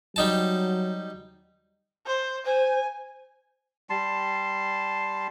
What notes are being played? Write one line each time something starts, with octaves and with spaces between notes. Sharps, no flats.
F#3 G3 D#4 A5
C5
C5 G#5
G3 A5 C6